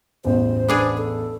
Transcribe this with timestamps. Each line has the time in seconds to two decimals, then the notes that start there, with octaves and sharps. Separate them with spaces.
0.24 A1 E2 C5
0.68 B3 D4 G#4
0.97 A4